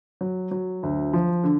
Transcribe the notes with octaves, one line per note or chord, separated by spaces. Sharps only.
F#3
F#3
D2
F3
D3